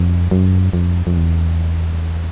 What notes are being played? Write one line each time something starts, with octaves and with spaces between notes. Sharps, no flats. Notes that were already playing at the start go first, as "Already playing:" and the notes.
Already playing: F2
F#2
F2
F2
E2